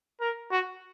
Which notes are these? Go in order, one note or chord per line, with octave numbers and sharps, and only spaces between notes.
A#4
F#4